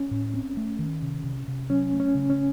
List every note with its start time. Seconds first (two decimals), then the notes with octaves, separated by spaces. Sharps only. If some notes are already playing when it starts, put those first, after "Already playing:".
Already playing: C#4
0.11 A2
0.34 C4
0.57 A3
0.79 D#3
1.02 C3
1.24 C3
1.48 C3
1.70 F#3 C#4
1.92 A3
2.00 C#4
2.15 C#3
2.30 C#4